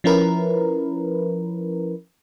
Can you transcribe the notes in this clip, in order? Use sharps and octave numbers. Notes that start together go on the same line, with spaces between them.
F3 C#4 E4 A#4 B4